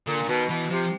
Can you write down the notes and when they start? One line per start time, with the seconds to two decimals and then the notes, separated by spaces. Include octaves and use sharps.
0.07 A#2 D3
0.23 D3
0.29 B2 D#3
0.49 B2 E3
0.70 C3 F3